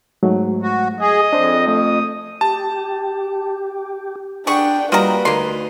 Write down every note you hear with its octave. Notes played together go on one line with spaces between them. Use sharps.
G#2 F#3 A3
F#4
G#4 D#5
F2 D4 C5
A3 D#6
G4 A5
D4 G#4 B4 F#5 G5 C#6
G3 A#3 F4 F#4 B4 D#5 A#5
D2 A#3 D#4 C6